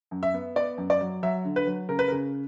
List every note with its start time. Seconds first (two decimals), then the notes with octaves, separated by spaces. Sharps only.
0.11 F#2
0.23 E5
0.34 B3
0.56 B3 D5
0.78 F#2
0.90 D5
1.01 F#3
1.23 F#3 E5
1.45 D3
1.56 B4
1.67 F#3
1.89 C#3 A#4
1.99 B4
2.08 A#4
2.12 C#3